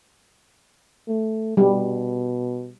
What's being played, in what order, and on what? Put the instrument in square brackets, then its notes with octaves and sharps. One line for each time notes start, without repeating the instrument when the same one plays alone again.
[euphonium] A3
[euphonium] B2 [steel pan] G3